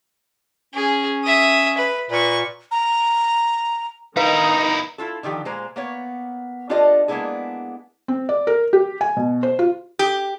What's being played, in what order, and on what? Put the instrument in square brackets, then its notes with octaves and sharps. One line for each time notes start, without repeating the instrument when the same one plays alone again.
[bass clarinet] C#4 [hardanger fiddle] G#4
[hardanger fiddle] E5 D#6
B4
[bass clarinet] A#2 [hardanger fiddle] B4 C#6
[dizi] A#5
[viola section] D#3 D#5 [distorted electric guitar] D#4 E4 [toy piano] B4 F5 [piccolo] A#5
[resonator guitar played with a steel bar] E4 F4 A4
D3 D#3 F3 G4
A#2 G#3 C5 A#5
A#3 B3 C#5
D4 F4 G4 A4 D5 D#5
G#3 A#3 B3 D4 E4 G#4
[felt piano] C4
D5
A#4
G4
G#5
B2
C5
F4
[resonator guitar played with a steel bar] G4